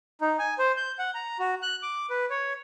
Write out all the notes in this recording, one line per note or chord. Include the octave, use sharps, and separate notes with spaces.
D#4
G#5
C5
G6
F#5
A#5
F#4
F#6
D6
B4
C#5